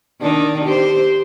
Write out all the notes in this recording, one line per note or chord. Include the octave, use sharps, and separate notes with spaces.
D#3 D4 D#4
G4 C5